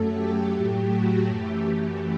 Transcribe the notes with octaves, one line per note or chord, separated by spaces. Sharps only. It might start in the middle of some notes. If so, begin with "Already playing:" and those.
Already playing: F#2 F#3 A3 A4
G4
A2 F#3 A3
F#4
F#2 E3 A3 G4
G4